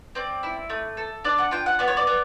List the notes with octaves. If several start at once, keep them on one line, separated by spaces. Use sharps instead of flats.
C4 D5
E4
A3
A4
D4 D5
F#5
F4 G5
F#5
B3 D5
C#5
D5
B3